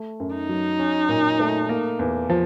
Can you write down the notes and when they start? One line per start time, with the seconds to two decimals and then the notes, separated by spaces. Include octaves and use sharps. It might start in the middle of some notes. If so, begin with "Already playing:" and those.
Already playing: A3
0.20 F#2
0.34 D#4
0.49 F#3
0.79 C#4
1.09 A#2
1.40 A3
1.69 A#3
1.99 E2
2.30 F3